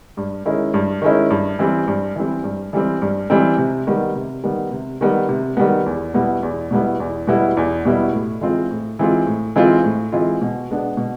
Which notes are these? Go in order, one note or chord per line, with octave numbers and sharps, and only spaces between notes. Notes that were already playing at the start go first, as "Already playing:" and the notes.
G2
D#3 G#3 C#4 E4
G2
D#3 G#3 C#4 E4
G2
E3 G3 C4
G2
E3 G3 C4
G2
E3 G3 C4
G2
E3 G3 C4
C3
D#3 G3 B3
C3
D#3 G3 B3
C3
D#3 G3 B3
C3
D#3 G3 B3
E2
B2 G3 B3 E4
E2
B2 G3 B3 E4
E2
B2 G3 B3 E4
E2
B2 G3 B3 E4
A2
E3 G#3 C4 F4
A2
E3 G#3 C4 F4
A2
E3 G#3 C4 F4
A2
E3 G#3 C4 F4
B2
G#3 B3 D4
B2